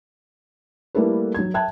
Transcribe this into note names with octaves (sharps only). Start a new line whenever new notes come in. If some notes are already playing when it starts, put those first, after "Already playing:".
G3 A3 A#3 E4 A4 B4
F#3 G#6
E5 G5 A5 F#6 G#6